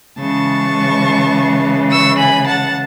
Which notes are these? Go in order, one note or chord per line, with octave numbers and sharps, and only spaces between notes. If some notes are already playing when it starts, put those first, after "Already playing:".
C#3 E3 G#3 A5 C#6
C#6 E6
G#5 B5
F#5 A5